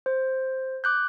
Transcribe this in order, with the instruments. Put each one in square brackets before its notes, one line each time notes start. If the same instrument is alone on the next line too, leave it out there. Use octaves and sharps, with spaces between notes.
[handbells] C5
D6 F#6 G6